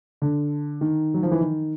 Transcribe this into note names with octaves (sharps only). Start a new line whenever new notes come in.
D3
D#3
F#3
F3
E3
D#3